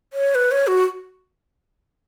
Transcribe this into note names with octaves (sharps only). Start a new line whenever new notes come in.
C#5
B4
C#5
F#4